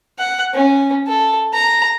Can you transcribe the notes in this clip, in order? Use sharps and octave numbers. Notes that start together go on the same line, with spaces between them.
F#5
C#4
A4
A#5